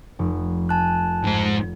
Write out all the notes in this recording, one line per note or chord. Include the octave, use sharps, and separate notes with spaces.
F1
G#5 A5 F#6
G#2 C5